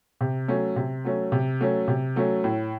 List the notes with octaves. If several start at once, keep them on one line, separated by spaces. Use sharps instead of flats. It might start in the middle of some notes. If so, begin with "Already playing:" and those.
C3
F#3 A3 C#4
C3
F#3 A3 C#4
C3
F#3 A3 C#4
C3
F#3 A3 C#4
A2